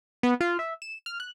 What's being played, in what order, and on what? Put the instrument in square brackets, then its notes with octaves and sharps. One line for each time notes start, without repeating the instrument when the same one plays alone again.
[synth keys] B3
F4
E5
E7
F6
F#6